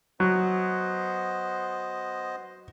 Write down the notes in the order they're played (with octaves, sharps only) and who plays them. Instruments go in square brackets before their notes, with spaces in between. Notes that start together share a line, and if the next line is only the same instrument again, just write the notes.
[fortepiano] F#3 [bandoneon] B3 C5 D#5